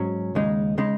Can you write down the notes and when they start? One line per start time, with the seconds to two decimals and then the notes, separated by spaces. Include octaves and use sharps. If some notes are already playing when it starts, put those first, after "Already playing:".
Already playing: G#2 F#3 C#4
0.35 D#2 C#3 G#3 D#4
0.78 C#3 G#3 D#4